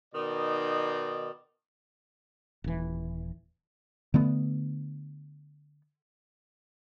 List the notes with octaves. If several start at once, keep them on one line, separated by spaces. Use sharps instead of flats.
B2 D#3 D#4 D5
D#1 E3
D3 A3 B3